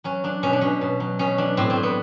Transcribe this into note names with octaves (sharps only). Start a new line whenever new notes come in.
F#3 C#4
F#3 D4
B2 C#4
D4
B2 C#4
B2
F#3
B2 C#4
F#3 D4
A2 C4
C4
A2
B3